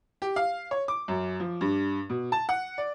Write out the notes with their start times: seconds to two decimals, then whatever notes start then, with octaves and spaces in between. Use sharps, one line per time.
0.22 G4
0.36 F5
0.71 C#5
0.88 D6
1.08 F#2
1.40 F3
1.61 G2
2.10 B2
2.32 A5
2.49 F#5
2.78 D5